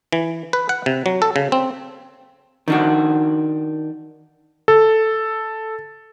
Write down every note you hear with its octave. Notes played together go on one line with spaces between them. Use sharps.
E3
B4
F#5
C3
F#3
A4
C#3
C4
D#3 D4 F#4
A4